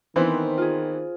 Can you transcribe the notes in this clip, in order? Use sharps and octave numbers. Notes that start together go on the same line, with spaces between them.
D#3 E3 B3 C4 C5
F4 G#4